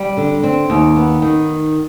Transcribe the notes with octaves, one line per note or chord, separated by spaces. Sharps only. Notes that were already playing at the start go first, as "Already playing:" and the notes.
Already playing: G3
D3
C4
D#2
B3
D#3